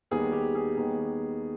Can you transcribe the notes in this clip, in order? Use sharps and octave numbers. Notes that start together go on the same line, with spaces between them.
D#2 D#3 G3 B3 G#4
G4
G#4
D#2 D#3 G3 B3